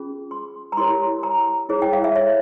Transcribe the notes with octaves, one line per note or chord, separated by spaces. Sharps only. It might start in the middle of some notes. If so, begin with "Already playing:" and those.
Already playing: C#4 F4 G#4
C6
A#5
E4 G4 A#4 C#5 C6
A#5
E4 G#4 C#5
G5
F5
E5
C#5